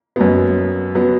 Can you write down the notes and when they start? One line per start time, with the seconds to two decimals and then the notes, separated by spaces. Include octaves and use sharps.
0.16 F#2 F#3 B3
0.95 F#3 B3